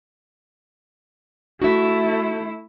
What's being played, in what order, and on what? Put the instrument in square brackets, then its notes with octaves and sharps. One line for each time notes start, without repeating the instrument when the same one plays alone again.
[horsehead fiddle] A3 E4 [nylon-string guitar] F#4 E5